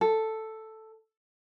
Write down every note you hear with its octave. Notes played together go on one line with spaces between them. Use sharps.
A4